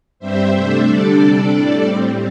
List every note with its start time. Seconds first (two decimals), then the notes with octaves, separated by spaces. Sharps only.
0.19 G2 G3 C4 C5 E5
0.52 C3 A3 D4
0.84 D3 G3 D4 A4 D5
1.16 C3 G3 D4
1.49 A2 G3 D4
1.81 A2 G3 C4